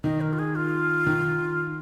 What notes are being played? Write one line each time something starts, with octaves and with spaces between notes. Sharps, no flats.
D#3 D#5
A#4
F4
G#4
F4
D#3